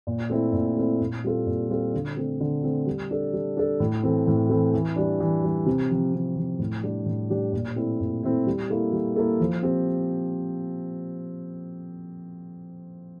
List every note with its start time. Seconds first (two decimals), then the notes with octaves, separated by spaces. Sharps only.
0.07 A#2
0.30 A3 C4 E4
0.53 A#2
0.77 A3 C4 E4
1.00 A#2
1.24 G3 C4 F4 A4
1.47 A#2
1.70 G3 C4 F4 A4
1.94 D3
2.17 A3 C4
2.41 D3
2.64 A3 C4
2.86 G3
3.11 D4 A4
3.33 G3
3.57 D4 A4
3.80 A2
4.03 E3 A3 C4
4.27 A2
4.50 E3 A3 C4
4.74 E3
4.96 G3 D4
5.20 E3
5.44 G3 D4
5.66 C3
5.91 F3 C4
6.14 C3
6.36 F3 C4
6.59 A2
6.83 G3 D4 G4
7.06 A2
7.30 G3 D4 G4
7.53 A#2
7.76 A3 C4 E4
8.01 A#2
8.23 A3 C4 E4
8.47 G3
8.70 A#3 E4 A4
8.93 G3
9.16 A#3 E4 A4
9.40 F3
9.63 C4 G4